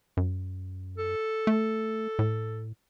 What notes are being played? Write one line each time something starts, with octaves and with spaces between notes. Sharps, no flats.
F#2
A4
A3
A2